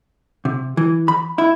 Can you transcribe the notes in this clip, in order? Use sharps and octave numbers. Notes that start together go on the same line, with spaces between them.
C3
E3
B5
E4